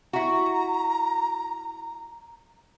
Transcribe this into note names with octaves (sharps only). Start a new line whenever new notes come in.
E4 F#4 A#5